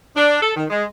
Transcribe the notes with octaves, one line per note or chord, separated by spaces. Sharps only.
D4
A4
D#3
G#3